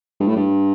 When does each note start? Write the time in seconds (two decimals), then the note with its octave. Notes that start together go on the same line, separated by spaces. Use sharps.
0.20 G2
0.27 A2
0.36 G2